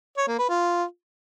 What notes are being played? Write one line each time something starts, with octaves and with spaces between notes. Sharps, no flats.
C#5
A#3
B4
F4